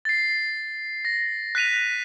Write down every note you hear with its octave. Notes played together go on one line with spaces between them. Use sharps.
A6 C7
A#6
F#6 B6 D#7 F7